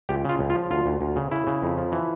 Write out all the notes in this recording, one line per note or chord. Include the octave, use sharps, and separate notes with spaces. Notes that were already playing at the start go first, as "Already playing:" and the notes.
C#2 G4
C#3 F4
C#2
F4
F3
D2 F4
D2
D2
C#3
C#3 E4
C#3
F2
F3
E3